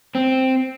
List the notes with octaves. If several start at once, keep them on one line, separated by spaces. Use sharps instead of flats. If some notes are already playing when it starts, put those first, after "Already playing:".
C4